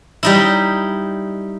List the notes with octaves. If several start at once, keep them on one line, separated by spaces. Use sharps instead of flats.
G3 D#4 E4